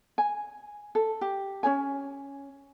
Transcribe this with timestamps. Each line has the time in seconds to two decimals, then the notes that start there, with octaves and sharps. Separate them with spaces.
0.18 G#5
0.95 A4
1.21 G4
1.63 C#4 G#4 C#5 G#5